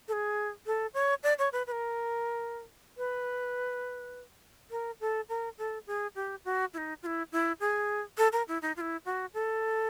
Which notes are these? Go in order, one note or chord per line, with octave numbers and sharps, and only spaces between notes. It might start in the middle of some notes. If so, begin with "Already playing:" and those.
A4
G#4
A4
C#5
D5
C#5
B4
B4
A#4
B4
A#4
A4
A#4
A4
G#4
G4
F#4
E4
D#4
F4
E4
E4
G#4
A4
A#4
E4
D#4
F4
E4
F#4
A4